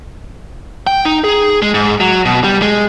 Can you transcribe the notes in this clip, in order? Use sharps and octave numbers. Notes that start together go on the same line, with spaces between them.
G5
D#4
G#4
G#3
G#2
F#3
B2
G3
G#3